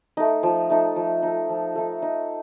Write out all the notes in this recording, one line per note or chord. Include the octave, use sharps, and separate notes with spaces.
A3 D#4
F3
A3 D#4
F3
A3 D#4
F3
A3 D#4
D#4